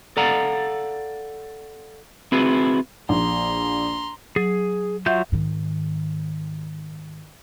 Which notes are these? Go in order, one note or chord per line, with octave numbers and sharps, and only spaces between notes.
A4 D5 F5 F#5 A#5
C4 E4 F#4 G#4 B4
A#1 A#5 C6
F#3 G#4
F#3 F4 E5 F#5 G6
G#2 D#3